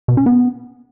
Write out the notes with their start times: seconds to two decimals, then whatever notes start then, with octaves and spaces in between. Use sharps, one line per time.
0.08 B2
0.17 C#4
0.26 B3